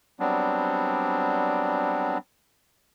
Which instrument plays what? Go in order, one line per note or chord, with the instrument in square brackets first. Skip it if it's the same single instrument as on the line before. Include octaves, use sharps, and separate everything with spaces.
[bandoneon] F#3 G3 B3 C4 D4